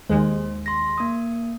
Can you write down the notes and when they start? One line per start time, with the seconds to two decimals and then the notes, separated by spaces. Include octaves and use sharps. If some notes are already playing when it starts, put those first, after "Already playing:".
0.10 D#2 G#3 C5
0.66 C6 A#6
0.98 A#3 D#6